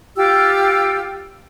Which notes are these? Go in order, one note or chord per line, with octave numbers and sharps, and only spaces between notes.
F4 G4 E6